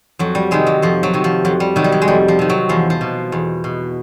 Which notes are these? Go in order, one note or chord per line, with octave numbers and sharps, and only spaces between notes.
F2 F#3
G3
C3 D#3 G#3
F#3
F2 F3
F#3
C3 D#3
F3
F2 F#3
G3
C3 D#3 F#3
G3
F#3
G#3
F2 G3
F3
C3 D#3
F#3
E2 F3
F3
B2
E2
B2